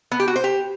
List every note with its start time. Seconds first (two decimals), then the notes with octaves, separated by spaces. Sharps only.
0.11 B3
0.20 G4
0.28 F#4
0.36 C5
0.44 G4